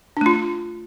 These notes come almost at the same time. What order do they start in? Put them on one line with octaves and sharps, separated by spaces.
D4 A3 F4